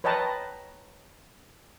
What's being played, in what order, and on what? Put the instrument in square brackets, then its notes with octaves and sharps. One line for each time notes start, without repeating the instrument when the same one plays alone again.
[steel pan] B4 C#5 D#5 G5 A5 A#5